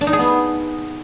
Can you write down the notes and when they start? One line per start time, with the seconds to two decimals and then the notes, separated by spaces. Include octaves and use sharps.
0.01 D4
0.07 D#4
0.13 G#4
0.19 B3